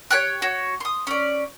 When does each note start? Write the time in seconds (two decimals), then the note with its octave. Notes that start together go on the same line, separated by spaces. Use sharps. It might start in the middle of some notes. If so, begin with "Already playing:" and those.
0.11 G4 C#5 G5 F#6
0.42 F#4 C#5
0.80 C6 D#6
1.07 C#4 D5